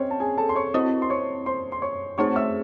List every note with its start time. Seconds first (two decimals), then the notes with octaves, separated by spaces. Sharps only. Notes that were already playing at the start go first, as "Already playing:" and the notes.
Already playing: C4 C#4 C5 C#5 D#5
0.11 A5
0.20 G#4 G#5
0.38 A4 A5
0.49 C6
0.56 C#5 C#6
0.74 C4 E4 C5 D#5 D#6
1.02 C6
1.10 C#5 C#6
1.46 C5 C6
1.72 C6
1.82 C#5 C#6
2.18 A3 C4 D#4 G#4 C5 C#5 C#6
2.36 E5 E6